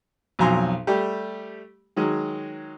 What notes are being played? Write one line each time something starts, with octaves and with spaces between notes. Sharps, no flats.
B1 F2 F#3 G#5 A#5 C6
G3 A3 G4
D#3 F#3 G#3